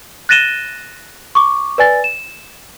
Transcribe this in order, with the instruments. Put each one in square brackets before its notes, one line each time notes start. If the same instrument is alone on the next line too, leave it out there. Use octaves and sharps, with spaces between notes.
[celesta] F#6 A6 A#6 D#7 E7 G7
C#6 D6
B4 D5 G#5 A6
E7